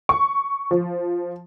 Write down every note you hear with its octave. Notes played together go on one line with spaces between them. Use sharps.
C#6
F3